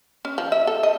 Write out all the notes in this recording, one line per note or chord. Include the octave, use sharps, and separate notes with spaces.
C#4
F3
E5
A4
D#5